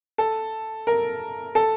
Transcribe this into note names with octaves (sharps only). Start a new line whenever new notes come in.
A4
A#4
A4